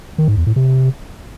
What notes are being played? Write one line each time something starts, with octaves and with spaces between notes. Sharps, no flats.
D#3
G#2
E2
A2
C3